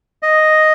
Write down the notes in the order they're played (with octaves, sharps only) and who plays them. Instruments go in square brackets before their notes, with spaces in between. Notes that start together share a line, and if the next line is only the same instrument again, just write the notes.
[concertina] D#5